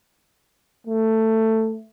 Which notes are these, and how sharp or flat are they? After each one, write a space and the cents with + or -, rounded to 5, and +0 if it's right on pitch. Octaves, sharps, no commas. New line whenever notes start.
A3 +15